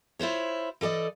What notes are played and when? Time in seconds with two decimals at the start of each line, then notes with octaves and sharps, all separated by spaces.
0.19 E4 F4 C5 C#5
0.81 E3 A4 D5 D#5